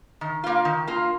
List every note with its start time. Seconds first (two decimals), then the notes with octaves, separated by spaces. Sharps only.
0.21 D#3
0.44 A#3 F4
0.65 D#3
0.87 A#3 F4